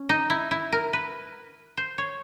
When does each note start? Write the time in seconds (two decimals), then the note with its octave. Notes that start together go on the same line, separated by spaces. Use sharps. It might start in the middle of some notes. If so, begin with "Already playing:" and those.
Already playing: C#4
0.09 D#4
0.30 E4
0.51 E4
0.72 A#4
0.93 B4
1.77 C5
1.98 C#5